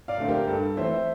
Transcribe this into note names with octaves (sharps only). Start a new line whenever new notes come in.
D5 F5
D3 A3 C4
G4 A#4
G2 A4
E3 A3 C4 C5 E5